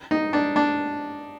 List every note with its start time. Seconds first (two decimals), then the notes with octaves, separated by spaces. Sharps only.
0.11 D#4
0.33 D4
0.56 D4